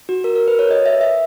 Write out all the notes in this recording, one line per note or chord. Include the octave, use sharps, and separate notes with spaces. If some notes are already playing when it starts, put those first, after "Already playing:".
F#4
A#4
A#4
B4
C#5
D#5
E5
E5